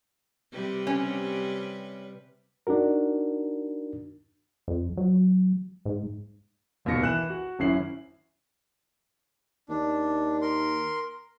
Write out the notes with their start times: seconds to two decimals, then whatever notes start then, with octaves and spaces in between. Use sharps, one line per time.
0.52 C3 G3 B4
0.87 C#4
2.67 D4 D#4 F#4 A#4
4.68 F2
4.97 F#3
5.85 G#2
6.85 D#1 D#2 B2 A#6 C#7
7.02 E3 F#6 E7
7.30 F#4
7.59 G#1 F#2 C#4 E4 C7 F#7
9.69 D#2 D4
10.42 A#4 C6